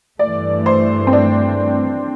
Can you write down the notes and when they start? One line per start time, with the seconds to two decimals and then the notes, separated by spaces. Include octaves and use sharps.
0.19 G2 E3 A3 D5
0.66 C5
1.07 C4
1.13 D4